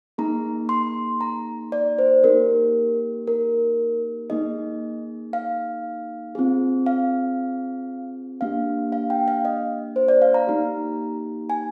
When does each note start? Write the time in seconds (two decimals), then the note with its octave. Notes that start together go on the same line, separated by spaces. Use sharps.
0.18 A#3 D#4 G#4 A#5
0.69 C6
1.21 A#5
1.72 D5
1.99 C5
2.23 A#3 D#4 G4 A#4
3.27 A#4
4.30 A#3 D#4 G#4 D#5
5.33 F5
6.35 C4 F4 G#4
6.86 F5
8.41 A#3 D4 G4 F5
8.92 F5
9.10 G5
9.28 F5
9.45 D#5
9.96 C5
10.08 D5
10.22 F5
10.34 A#5
10.47 A#3 D#4 G4
11.50 G#5